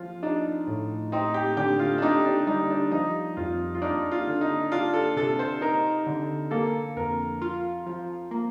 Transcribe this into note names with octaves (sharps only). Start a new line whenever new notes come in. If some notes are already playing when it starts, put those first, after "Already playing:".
Already playing: F3 F4
D4 D#4
A2
C4 D#4
G4
D3 G4
F4
D4
D#4 G4
D4
G3 D#4
D4
F3 D#4
F2 F4
F4
D4 D#4
F4
D3
D#4
D4 F4
A4
C3 A4
C5
D#4 A#4
D3
A#3 A4
F2 A#4
F4
F3
A#3